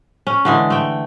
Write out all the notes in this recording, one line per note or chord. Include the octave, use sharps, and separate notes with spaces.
C#4
D3 E3 G#3
A3 G5